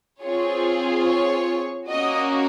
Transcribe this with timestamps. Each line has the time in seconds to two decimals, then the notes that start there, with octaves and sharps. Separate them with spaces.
0.19 C4 F4 G#4 C#5
1.03 C#5
1.87 A#3 C#4 F#4 D#5